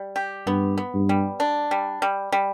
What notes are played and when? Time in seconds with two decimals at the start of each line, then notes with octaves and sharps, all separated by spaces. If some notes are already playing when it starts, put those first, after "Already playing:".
Already playing: G3
0.16 G4
0.47 G2 B3
0.78 B3
0.94 G2
1.09 G3
1.40 D4
1.71 G3
2.02 G3
2.32 G3